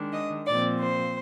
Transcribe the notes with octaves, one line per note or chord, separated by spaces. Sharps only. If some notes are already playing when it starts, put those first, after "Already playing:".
Already playing: D#3 G#3 D4
D#5
A#2 F3 C4 D5
C5